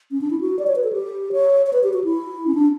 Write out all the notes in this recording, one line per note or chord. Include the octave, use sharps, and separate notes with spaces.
C#4
D4
E4
F#4
D5
C#5
B4
A4
G4
C#5
C#5
B4
G4
F#4
E4
C#4
D4